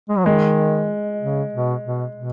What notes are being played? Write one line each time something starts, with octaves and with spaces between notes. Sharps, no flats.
G#3
F#3
D#3 G#3
C#3
B2
B2
B2